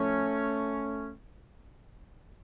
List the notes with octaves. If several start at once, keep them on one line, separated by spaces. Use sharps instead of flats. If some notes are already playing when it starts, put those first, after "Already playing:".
Already playing: A2 F3 A3 C#4